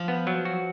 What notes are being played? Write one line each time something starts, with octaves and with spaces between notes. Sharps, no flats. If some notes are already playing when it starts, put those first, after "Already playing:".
Already playing: F3
B3
F#3
F#4